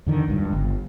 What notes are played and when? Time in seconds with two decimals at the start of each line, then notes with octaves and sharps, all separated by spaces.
0.06 F2 D3 D#3
0.28 C#2 G2
0.53 G1